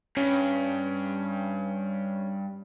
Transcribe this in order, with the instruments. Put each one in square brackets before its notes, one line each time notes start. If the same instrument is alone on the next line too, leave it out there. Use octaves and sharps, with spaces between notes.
[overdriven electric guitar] G2 [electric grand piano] C#4